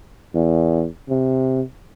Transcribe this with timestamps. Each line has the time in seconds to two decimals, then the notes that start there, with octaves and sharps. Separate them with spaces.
0.35 E2
1.09 C3